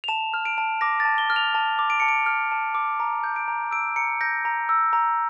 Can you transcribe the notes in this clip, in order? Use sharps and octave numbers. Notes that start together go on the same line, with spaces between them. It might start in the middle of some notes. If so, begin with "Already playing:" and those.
F7
A5 E7
F6
D7
A5
D6 A#6
A6
A5
G7
F6
F7
A5
D6
D7
A5 C#7
D7
F6
A5
D6
A#5
G6
D7
A#5
E6 D7
A#5 C#7
G6 A#6
A#5
E6
A#5